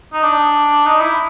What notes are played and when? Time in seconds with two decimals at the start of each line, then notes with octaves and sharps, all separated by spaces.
0.13 D#4
0.23 D4
0.86 D#4
1.01 E4